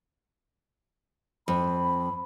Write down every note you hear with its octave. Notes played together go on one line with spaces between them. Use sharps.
F2 B5